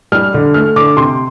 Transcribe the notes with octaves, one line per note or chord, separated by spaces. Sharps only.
G3 F6
D3
A3 F6
D3 D6
C3 C6